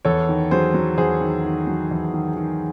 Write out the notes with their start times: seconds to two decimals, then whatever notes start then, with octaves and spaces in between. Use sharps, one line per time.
0.05 E2 A4 C#5
0.29 D#3
0.51 F#3 G#4 C5
0.74 F#3
0.98 E2 G#4 C5
1.21 D#3
1.45 D#3
1.67 F#3
1.91 E2
2.14 D#3
2.37 D#3